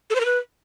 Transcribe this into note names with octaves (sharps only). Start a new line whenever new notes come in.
A4
C5
A#4
B4